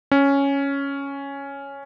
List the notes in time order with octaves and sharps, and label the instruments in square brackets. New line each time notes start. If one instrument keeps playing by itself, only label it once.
[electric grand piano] C#4